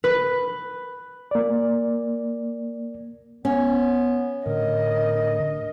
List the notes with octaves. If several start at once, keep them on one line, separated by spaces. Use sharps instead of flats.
B4
A#3 D5
B3 C#4
A2 D3 A#4 D#5